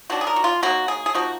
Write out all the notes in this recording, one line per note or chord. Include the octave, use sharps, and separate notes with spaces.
D#3 F#3 D4 F#4
G#4
A#4
F#4
F4
F#3 A#3 D#4 F#4
G#4
G#4
F3 A#3 D#4 F#4